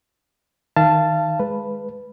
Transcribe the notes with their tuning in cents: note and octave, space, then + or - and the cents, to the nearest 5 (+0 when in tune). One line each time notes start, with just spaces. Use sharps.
D#3 +0 F5 -25 A5 +0
G#3 +0 B4 +0